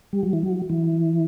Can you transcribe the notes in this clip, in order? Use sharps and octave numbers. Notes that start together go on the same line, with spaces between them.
G3
F#3
E3
F#3
E3